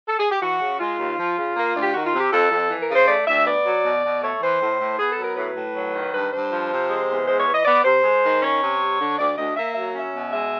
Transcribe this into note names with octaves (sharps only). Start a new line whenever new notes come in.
A4
G#4
G4
E3 F#4
C#3
G#3 F4
D#2
F3
C#3
A#3
D2
G4
D#3 F#4
F4
C3
G4
F2 A4
F2
E3
A#4
C#3
C5
A3 D5
D2 E5
B3 D5
F#3
B2
B2
A3 C#5
E3 C5
A2
A2
B3 G#4
A4
F#3
A#4
A2 B4
A2
F#3
D#3
G2 B4
G2 C5
F3
C3
G#3
E2
G#3 C5
C#5
E3
D#5
B3 D5
C3 C5
G#3
D#3
C#4 C#5
C3
G3
D3
D2 D5
D2 D#5
A#3 E5
F#3 E5
C#4 E5
B2
G#3 E5